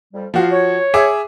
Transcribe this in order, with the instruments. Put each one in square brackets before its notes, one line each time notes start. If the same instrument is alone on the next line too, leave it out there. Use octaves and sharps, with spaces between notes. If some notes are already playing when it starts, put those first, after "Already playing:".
[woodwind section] F2 G3
[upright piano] F3 F#4 [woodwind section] F4 D5 F5
[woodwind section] C#5
[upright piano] G#4 E5 D6